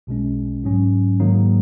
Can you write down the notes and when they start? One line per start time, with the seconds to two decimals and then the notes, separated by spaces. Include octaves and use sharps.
0.07 B1 B2 G#3 C#4
0.64 G#2 F#3 C#4
1.20 G#2 D#3 F#3 A#3 D#4